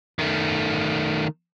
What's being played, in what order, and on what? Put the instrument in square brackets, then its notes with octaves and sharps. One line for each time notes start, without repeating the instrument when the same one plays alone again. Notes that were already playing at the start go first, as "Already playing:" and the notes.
[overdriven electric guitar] D#3 A3